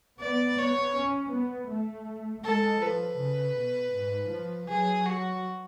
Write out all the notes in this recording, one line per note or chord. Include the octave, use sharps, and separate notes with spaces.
B3 D5
B3 C#5
C#4
B3
A3
G#3 A4
F3 B4
C#3
B2
G#2
F3
F#3 G#4
F#4